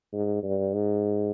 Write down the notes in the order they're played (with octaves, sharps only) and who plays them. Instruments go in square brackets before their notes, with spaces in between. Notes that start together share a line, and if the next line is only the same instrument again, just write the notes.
[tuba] G#2
G2
G#2